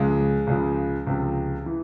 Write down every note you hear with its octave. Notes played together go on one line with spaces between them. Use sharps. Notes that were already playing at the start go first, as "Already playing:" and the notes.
Already playing: C#2 C#3 F3 G#3
C#2 C#3 F3
C#2 C3 F3
E3